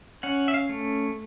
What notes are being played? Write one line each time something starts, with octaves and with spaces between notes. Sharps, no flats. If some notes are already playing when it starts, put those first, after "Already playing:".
C#4 F#5
E5
F5
A3